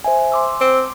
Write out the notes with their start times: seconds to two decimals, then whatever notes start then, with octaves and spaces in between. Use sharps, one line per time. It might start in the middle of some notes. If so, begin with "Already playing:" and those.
0.04 C5 E5 G#5
0.32 C6 D6 E6
0.61 C4